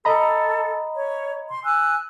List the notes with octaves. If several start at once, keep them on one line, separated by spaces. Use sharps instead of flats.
A4 D#5 A#5 B5
C#5
C6
G#5 E6 F#6